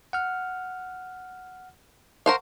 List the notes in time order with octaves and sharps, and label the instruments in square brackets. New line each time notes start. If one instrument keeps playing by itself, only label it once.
[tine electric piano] F#5 F6
[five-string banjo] A#4 C5 F5 [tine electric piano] F#5 C#6